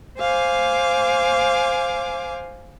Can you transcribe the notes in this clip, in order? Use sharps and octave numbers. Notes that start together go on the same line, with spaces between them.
C5 F5 G#5 D6